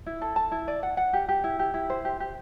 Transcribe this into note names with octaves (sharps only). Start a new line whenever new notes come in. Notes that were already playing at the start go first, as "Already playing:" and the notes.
E4
A4
A5
E4
D5
F#5
F#5
G4
G4
E4
G4
E4
C5
G4
G4